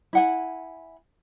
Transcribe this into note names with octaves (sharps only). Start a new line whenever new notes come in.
E4 F#5 G#5